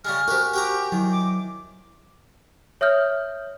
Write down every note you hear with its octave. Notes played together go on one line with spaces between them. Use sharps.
C#3 G3 G#3 G#5 F6
F#4 G4 A#4 C5
F#4 G4 G5 A#5
D#3 F#3 E4
D6
C#5 E5 D#6 F6 G6